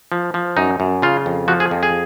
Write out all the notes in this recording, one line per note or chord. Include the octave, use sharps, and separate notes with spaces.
F3
F3
F#2 D#4
F#2
C#3 F4
F2
F3 F#4
G#4
F2
G#4